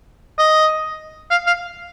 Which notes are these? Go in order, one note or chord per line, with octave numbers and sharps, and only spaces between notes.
D#5
F5
F5